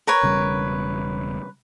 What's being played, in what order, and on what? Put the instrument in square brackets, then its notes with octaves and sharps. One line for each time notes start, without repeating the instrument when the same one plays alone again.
[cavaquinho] A#4 B4 C#5
[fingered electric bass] E1 C#3 G3